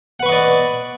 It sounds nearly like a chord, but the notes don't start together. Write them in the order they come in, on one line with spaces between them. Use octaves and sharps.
F#5 B4 C#6 D#5 D5